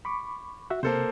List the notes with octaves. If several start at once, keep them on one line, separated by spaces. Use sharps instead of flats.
B5 C#6 D6
F#4 E5 F#5
C3 A#3 A4 C5